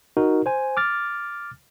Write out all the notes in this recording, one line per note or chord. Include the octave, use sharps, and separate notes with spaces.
D#4 F#4 A#4
C5 G#5
D6 F6 A6